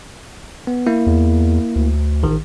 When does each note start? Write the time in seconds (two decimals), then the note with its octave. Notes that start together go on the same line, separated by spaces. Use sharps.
0.67 B3
0.86 A#3 E4
1.07 E2
1.76 D2
2.23 A1 D#3